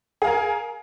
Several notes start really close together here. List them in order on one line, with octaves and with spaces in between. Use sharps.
G#4 F5 A#4